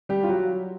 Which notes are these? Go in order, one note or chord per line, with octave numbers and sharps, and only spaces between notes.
G3 G4
F4
F#3 F#4